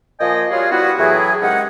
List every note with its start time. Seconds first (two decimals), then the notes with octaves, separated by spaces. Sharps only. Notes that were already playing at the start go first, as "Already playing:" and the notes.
0.20 A#2 F3 D#5 G5 G#5
0.51 G3 F4 F#4 G#4 C#5
0.72 G3 B3 E4 F#4
0.99 A2 E3 F#3 E4 G#4
1.41 C3 D#3 G#3 C#4 D#4 F#5